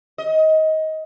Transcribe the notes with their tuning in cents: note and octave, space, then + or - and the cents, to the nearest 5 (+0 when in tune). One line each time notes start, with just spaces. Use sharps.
D#5 +20